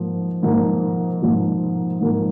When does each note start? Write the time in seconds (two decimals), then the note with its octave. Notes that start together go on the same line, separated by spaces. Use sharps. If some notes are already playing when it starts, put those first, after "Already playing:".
Already playing: G#2 F3 A#3
0.43 G#2 F3 A#3
1.22 G#2 F3 A#3
2.01 G#2 F3 A#3